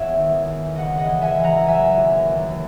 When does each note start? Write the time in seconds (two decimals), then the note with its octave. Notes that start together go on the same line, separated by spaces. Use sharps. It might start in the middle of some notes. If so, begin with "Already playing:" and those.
Already playing: E2 C#5 E5 F#5
0.15 D#3
0.46 E2
0.73 C#3 D#5 F#5
0.98 D#5 F#5
1.06 E3
1.21 E5 G#5
1.37 E3
1.44 F#5 A#5
1.67 F#3 E5 G#5
1.97 D#2
2.29 D#2